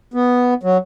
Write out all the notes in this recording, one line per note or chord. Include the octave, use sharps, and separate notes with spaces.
B3
F#3